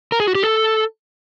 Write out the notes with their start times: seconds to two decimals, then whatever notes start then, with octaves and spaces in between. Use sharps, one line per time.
0.12 A#4
0.20 G#4
0.28 F#4
0.35 G4
0.43 A4